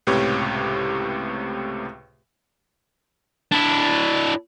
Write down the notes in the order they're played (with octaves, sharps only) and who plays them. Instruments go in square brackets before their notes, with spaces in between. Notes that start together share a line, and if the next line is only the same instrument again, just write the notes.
[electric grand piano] C#2 A2 C3 G4 B4 C#5
[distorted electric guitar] D4 E4